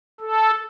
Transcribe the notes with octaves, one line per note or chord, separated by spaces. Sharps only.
A4